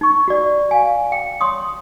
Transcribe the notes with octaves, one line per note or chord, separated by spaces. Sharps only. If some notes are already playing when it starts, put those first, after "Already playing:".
D#4 C#6
F#4 D5
F5 G#5
G5
C#5 C6 D#6